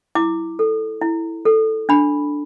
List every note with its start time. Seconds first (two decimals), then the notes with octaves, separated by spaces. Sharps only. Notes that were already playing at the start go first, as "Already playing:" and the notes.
0.15 E4 D6
0.59 A4
1.01 E4
1.45 A4
1.89 D4 B5